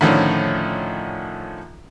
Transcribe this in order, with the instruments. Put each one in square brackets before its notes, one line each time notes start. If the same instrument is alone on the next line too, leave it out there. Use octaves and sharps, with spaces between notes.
[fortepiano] A2 D3 D#3 F3 C#4 F4